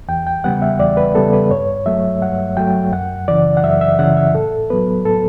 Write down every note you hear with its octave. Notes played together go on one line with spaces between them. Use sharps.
E2 G5
G5
C#3 G3 B3 F#5
E5
E2 D5
B4
C#3 G3 B3 A4
B4
G2 C#5
F#3 A3 E5
G2 F#5
F#3 A3 G5
F#2 F#5
C#3 E3 D5
F#5
F#2 E5
E5
C#3 E3 F#5
E5
A2 A4
F#3 B3 B4
A2 A4